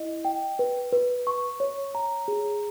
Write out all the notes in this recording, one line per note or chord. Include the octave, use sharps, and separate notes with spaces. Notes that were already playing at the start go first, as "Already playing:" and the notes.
Already playing: E4 D#5
G5
B4
B4
C#6
C#5
A#5
G#4